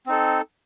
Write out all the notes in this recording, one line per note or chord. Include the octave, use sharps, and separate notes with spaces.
C4 D#4 A4